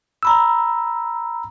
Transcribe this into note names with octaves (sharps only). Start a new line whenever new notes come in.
A#5 B5 E6